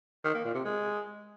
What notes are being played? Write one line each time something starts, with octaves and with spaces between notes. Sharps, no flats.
D#3
A#3
A#2
C3
G#3